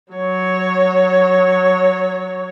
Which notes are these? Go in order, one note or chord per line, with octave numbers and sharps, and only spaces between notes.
F#3 C#5